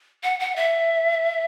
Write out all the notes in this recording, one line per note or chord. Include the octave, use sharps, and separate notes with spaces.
F#5
F#5
E5